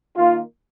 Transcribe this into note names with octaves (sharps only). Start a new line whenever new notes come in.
D#3 A#3 F4